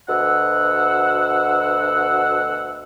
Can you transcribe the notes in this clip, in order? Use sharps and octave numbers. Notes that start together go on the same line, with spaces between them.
D2 B2 F#5 E6